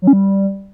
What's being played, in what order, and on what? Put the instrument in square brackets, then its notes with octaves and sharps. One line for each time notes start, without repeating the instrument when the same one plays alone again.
[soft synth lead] F#3
C#4
G3